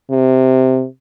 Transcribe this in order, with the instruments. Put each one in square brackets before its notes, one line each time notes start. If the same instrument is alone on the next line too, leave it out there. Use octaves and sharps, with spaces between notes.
[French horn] C3